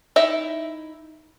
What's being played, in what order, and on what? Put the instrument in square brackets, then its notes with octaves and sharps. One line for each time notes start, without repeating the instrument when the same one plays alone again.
[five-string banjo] D#4 E4 E5